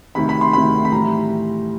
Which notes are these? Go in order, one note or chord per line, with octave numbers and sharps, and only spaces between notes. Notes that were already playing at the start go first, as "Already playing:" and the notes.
D2 C3 D#3 B5
B5
C6
D2 C3 D#3 B5
B5
A2 E3 G3 A#5